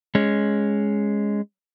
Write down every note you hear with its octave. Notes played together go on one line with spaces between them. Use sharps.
G#3 C#4